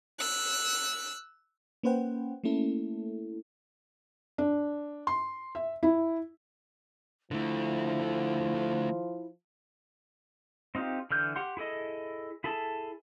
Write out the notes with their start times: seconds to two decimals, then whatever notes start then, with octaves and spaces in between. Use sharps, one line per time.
0.19 E6 F#6
1.83 A#3 C#4 B4 C5 F#5 G5
2.44 A3 A#3 C#4 E4 A4
4.38 D4
5.07 C6
5.55 E5
5.83 E4
7.31 D3 F3 A3 E4
10.75 C4 D#4 F4 G4
11.11 D3 E3 F6 G6
11.36 G4 F#5 C6
11.57 E4 G#4 A4 D#5
12.44 E4 G#4 A4 A5